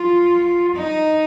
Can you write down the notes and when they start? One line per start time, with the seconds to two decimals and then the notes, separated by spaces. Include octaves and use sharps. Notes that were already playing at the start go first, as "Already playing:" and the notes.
Already playing: F4
0.75 D#4